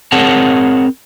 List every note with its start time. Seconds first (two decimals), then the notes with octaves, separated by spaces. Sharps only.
0.12 C4 G#4 A#4 C#5 F#5 A5